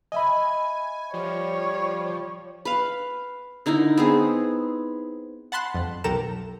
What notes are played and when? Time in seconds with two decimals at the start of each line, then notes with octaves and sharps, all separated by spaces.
0.12 D#5 E5 G#5 B5
1.14 F3 G3 C#5
2.65 B4 F5
3.66 D3 D#4 E4 A#4
3.97 B3 C4 G#4
5.52 F#5 A5 B5 C6 F#6
5.74 F2
6.04 B1 G4 A4 A#4 A#5 E7